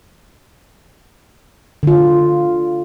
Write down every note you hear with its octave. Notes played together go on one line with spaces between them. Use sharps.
D3 F4